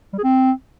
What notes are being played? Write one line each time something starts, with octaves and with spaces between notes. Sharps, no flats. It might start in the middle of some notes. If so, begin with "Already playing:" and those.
G3
G#4
C4